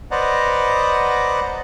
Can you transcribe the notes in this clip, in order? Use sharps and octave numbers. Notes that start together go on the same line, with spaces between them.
B4 C5 D5 D#5 F#5 A#5